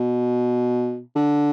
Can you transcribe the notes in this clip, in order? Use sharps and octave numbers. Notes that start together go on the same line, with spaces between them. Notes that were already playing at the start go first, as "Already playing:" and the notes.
Already playing: B2
D3